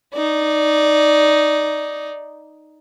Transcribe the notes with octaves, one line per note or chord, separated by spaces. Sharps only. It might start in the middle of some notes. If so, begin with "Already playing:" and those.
D#4 D5